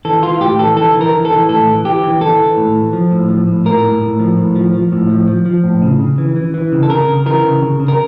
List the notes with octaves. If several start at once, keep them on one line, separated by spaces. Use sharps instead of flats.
E3 A4
E3 F4
A2 G4
E3 A4
E3 A4
E3
A#4
E3
A4
E3
A2 A4
E3
E3 G4
E3
E3 A4
E3
A2
E3
F3
A2
F3
A2
A2 A#4
A2
A2
F3
A2
F3
F3
A2
F3
F3
F3
A2
C#3
C#3
E3
E3
E3
C#3
A4
C#3 A#4
C#3
E3 A#4
C#3
C#3
C#3
A#4